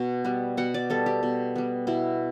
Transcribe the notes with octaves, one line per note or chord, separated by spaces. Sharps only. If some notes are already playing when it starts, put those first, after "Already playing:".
Already playing: B2
G3 B3
B2 F#5
D5
G3 B3 A4
G4
B2
G3 B3
B2 E4